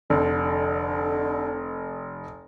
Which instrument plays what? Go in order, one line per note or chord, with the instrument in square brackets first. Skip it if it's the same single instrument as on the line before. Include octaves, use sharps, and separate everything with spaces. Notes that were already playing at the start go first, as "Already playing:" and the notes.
[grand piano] F1 [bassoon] D3